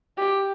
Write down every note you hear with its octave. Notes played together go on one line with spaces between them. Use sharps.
G4